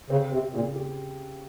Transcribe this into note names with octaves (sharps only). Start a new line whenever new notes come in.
C#3 C4
C3 C4
A#2 C#3
G4